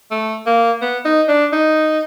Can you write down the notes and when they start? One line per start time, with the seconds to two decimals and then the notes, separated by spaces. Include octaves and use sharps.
0.11 A3
0.47 A#3
0.82 B3
1.05 D#4
1.29 D4
1.53 D#4